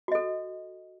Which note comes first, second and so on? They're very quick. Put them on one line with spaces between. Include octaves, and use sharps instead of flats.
F#4 D#5 A4